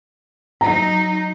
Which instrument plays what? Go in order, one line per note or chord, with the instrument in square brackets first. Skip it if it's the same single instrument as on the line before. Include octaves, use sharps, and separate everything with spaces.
[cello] F#3 D#4 [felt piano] A#5